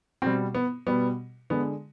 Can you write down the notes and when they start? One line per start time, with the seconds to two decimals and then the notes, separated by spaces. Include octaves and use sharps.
0.22 B2 G3 C4
0.55 B3
0.87 B2 G3 B3
1.50 D3 G#3 B3